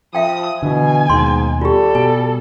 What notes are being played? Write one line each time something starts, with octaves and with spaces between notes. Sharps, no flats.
F3 E5 F5 G5 D#6
B2 D3 E3 G#5
D#2 G#2 B2 D#3 C6
G3 F4 G4 A4
B2 G#5